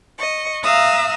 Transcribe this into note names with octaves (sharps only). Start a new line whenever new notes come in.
D#5 C#6
E5 F5 A#5 D#6 E6 F#6